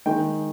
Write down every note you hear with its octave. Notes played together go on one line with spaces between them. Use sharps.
D#3 G#3 G5